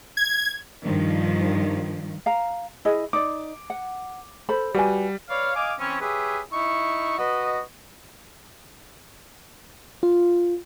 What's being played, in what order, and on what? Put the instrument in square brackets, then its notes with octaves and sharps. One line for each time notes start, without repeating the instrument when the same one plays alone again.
[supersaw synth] G#6
[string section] G2 D#3 F3
[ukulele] F5 A#5
E4 G#4 D#5
[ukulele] D#4 D5 [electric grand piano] D6
[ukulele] F#5
A4 C5 B5
[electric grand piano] G3 [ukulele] F#4 B4 G#5
[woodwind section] B4 C#5 D5 F5
D#5 F5 G#5 D6
E3 C4 C#4
G4 G#4 B4 C#5 E5
D#4 E4 C#6
F#4 B4 D#5
[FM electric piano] F4